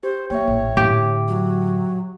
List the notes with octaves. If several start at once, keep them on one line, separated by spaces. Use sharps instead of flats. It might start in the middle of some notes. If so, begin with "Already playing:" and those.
G4 C5
A#3 C#5 E5 G5
A1 C3
A2 D3 G4
F#3